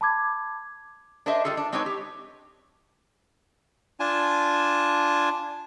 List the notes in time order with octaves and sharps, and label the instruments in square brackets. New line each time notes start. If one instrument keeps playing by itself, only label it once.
[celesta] A5 B5 D6 G#6
[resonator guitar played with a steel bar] D4 G#4 A#4 C5 D#5 E5
G3 F4 G#4 A4
D4
G#3 C4 D4 D#4 B4 C#5
G4
[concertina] D4 F4 G#5 A5